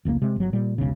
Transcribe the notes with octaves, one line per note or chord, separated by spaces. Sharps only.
F1 C#2 A#2 A#3
C3 G#3
G1 F#3
A#2 G3
E1 B1 C#3